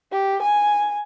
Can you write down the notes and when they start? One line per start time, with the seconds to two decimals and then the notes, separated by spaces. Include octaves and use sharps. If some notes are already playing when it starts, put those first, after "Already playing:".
0.12 G4
0.42 G#5